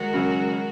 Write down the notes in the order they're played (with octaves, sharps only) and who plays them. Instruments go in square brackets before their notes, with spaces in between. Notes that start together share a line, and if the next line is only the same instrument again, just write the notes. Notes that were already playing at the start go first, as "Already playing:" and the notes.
Already playing: [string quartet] D#3 G#3 F#4 A#4
[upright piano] C#3 F#3